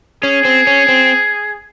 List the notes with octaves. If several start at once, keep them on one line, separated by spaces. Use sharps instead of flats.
C#4 G#4
C4
C#4
C4